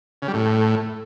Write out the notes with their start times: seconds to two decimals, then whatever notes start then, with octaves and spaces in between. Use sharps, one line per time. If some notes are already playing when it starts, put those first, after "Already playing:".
0.22 C#3
0.28 G3
0.34 A2